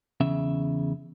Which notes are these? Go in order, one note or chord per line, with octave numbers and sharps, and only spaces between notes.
E2 C#3 E5